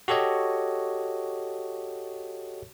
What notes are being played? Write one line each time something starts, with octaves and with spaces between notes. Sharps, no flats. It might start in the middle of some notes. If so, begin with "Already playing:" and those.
F#4 G4 A4 C#5 D#5